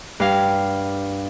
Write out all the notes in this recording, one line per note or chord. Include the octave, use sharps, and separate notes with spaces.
G2 F5